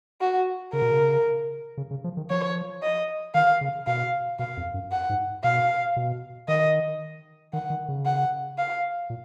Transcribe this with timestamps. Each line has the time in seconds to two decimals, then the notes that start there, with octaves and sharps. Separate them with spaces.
0.21 F#4
0.73 C#3 A#4
0.82 B2
0.92 C#3
1.77 C#3
1.91 C#3
2.04 F3
2.17 D#3
2.30 F3 C#5
2.83 D#5
3.34 D#3 F5
3.61 C#3
3.87 B2 F5
4.39 B2 F5
4.57 F2
4.74 F#2
4.92 F#5
5.09 G#2
5.44 B2 F5
5.96 B2
6.48 D#3 D#5
7.53 D#3 F#5
7.70 D#3
7.88 C#3
8.05 F#5
8.58 F5
9.10 A#2